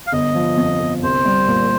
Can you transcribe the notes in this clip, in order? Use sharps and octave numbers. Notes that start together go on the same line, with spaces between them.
F5
G1 D#5
F3
F2
G1
C2 C5
G3
A#2